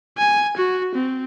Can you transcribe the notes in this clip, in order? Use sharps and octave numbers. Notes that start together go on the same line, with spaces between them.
G#5
F#4
C4